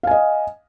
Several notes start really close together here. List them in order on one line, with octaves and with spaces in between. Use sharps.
F5 G#5 D#5